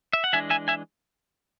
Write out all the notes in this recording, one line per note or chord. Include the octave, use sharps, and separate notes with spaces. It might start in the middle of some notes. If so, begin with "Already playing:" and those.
E5
F#5
E3 G#3 D4 E5 G#5
E5 G#5
E5 G#5